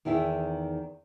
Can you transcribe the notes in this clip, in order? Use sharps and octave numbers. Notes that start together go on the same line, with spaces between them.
E2 D#3 E4 G#4 E5